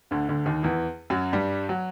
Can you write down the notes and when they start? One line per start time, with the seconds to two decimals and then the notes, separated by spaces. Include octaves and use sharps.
0.11 D2 D3
0.29 D2 D3
0.46 D#2 D#3
0.63 E2 E3
1.10 F#2 F#3
1.33 G2 G3
1.69 F#3